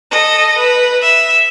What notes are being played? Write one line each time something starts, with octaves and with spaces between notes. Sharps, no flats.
A4 D#5
B4
E5